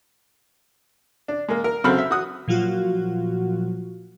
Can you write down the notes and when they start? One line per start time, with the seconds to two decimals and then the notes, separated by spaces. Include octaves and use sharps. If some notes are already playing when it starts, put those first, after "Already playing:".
1.28 D4
1.48 G#3 A#3
1.64 A#4
1.84 C#3 F#3 C4 A4 B5 F6
1.98 E5
2.11 F#4 D#6 F#6
2.48 A#2 F3 F#3 F4 F#4